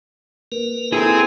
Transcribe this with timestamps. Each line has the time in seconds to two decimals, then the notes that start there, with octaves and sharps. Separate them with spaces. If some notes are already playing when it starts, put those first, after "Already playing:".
0.52 A#3 A#4 B4
0.92 C4 E4 G#4 A4 G#5 A#5